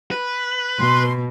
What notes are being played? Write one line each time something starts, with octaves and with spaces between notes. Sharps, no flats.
B4
B2 C6